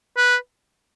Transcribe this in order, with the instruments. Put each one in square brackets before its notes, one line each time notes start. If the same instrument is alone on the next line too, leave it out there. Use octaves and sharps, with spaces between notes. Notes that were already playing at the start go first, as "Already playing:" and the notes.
[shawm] B4